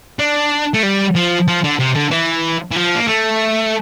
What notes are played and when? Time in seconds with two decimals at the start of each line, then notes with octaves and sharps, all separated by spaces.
0.19 D4
0.74 A3
0.83 G3
1.15 F3
1.48 F3
1.64 D3
1.80 C3
1.96 D3
2.11 E3
2.71 E3
2.76 F3
2.95 A#3
3.08 A3